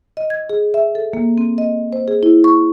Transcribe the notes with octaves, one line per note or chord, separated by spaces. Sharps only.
D#5
G#6
G#4
E5
A4
A#3
C4
D#5
C5
G#4
E4
C#6